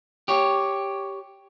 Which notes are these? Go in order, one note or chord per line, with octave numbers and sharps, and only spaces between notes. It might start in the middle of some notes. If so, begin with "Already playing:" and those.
G4 C#5